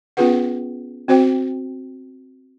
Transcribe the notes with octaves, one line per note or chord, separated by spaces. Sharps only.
B3 C#4 F4 G#4 B4 F#5
C4 F#4 C5 G5